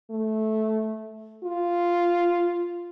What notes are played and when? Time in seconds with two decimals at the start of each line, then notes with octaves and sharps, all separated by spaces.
0.11 A3
1.44 F4